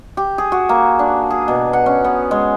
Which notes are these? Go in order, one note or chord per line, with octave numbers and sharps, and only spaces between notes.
G4
G#4
F#4
A#3
D4
G#4
B2
F#5
C#4
B3
G#3